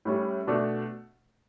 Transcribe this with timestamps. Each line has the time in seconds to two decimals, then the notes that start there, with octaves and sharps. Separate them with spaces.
0.05 A2 G3 C#4
0.47 B2 A3 D4